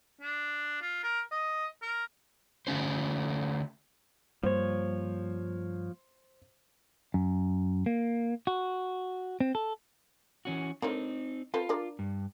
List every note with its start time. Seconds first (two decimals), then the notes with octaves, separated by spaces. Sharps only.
0.21 D4
0.82 F4
1.03 A#4
1.32 D#5
1.82 A#4
2.67 D3 A3 C#4 C5
4.44 G2 F3 G3 A#3 C5 C#5
7.14 F#2
7.86 A#3
8.47 F#4
9.40 C4
9.55 A4
10.45 E3 C#4 F#4
10.82 D3 C4 D#4 A#4 C#5
11.54 C4 F4 A4 B4
11.69 D4 A#4 D5
11.99 G2